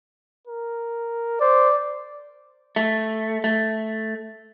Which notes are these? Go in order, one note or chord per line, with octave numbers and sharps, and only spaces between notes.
A#4
C5 D5
A3
A3